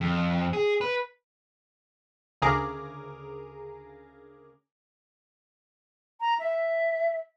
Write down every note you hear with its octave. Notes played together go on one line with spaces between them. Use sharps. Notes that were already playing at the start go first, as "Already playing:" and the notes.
F2
G#4
B4
D2 C#3 G#4 A#4 A#5 D6
A#5
E5